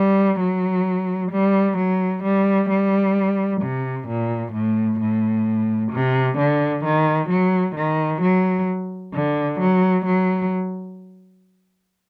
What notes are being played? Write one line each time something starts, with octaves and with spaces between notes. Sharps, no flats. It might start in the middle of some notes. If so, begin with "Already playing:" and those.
Already playing: G3
F#3
G3
F#3
G3
G3
C3
A#2
A2
A2
C3
D3
D#3
F#3
D#3
F#3
D3
F#3
F#3